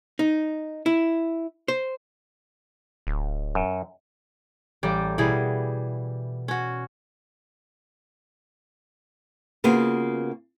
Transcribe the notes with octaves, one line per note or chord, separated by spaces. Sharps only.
D#4
E4
C5
D1
F#2
A1 G3 D5 G6
B2 E3 G3 G#4
C#4 F#4
C#3 A#3 B3 F4 F#4 G#4